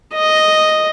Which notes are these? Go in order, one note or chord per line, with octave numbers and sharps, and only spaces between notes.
D#5